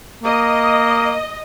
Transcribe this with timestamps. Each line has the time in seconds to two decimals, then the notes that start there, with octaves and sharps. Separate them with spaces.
0.24 A#3 D#5